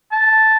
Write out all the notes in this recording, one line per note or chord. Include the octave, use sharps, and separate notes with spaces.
A5